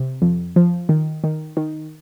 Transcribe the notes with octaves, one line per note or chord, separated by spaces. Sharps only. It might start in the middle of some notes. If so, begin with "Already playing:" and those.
Already playing: C3
F2
F3
D#3
D#3
D#3